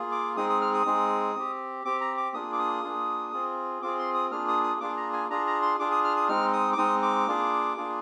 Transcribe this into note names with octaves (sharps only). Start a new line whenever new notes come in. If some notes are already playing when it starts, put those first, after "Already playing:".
Already playing: A#3 F4 G#4
D6
G#3 C4 D#4 G#4 D#6
D#6
F6
D#6
G#3 C4 D#4 G#4
C4 G4
C4 G4 D6
A#5
D6
A#3 D4 F4 G#4 D#6
D6
D#6
A#3 D4 F4 G#4
C4 F4 G#4
C4 F4 G#4 D6
C6
D#6
A#3 D4 F4 G#4 F6
D#6
D#6
A#3 D4 F4 G#4 D6
A#5
G#5
D4 F4 G#4 A#5
A#5
C6
D4 F4 G#4 D6
D#6
F6
D#6
G#3 C4 D#4 F6
D#6
D6
G#3 C4 D#4 D#6
D6
A#3 D4 F4 G#4
A#3 D4 F4 G#4